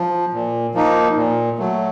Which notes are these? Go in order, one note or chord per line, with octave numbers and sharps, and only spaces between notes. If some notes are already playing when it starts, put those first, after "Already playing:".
Already playing: F3
A#2
F3 A#3 D#4
A#2
F#3 A3